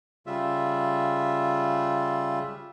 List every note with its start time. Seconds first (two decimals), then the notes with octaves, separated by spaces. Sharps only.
0.26 C#3 G3 F4 E5